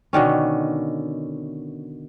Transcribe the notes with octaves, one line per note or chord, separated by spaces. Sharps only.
B2 D3 D#3 C#4